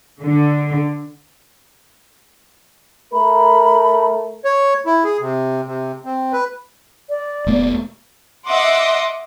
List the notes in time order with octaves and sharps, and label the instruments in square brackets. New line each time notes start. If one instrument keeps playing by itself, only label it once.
[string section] D3
[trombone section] A3 A#4 [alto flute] B5
[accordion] C#5
E4
G#4
C3
C3
C4
B4
[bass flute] D5
[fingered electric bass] E1 A3 B3
[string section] D#5 E5 F#5 C6 D6